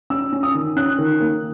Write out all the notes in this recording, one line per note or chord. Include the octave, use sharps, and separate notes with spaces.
C#4 E6
C#4
D#6
D#3
C#4 F#6
D#3
A#3